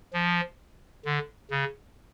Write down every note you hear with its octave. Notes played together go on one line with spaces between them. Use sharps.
F3
D3
C#3